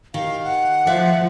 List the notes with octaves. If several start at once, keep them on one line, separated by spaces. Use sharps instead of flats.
D#3 G4 F5
F#5
F3 D5 E5 F5